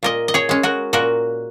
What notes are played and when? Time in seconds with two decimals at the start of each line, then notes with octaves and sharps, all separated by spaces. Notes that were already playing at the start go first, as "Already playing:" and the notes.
0.03 A#2 A#4 D#5
0.28 D#5
0.34 G#4 C#5
0.49 G#3 C#4
0.63 F#4 A#4
0.93 A#2 F#4 A#4